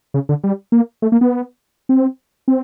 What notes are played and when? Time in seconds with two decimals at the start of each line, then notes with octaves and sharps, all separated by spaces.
0.14 C#3
0.29 D3
0.44 G3
0.72 A#3
1.02 A3
1.12 A#3
1.21 B3
1.89 C4
2.48 C4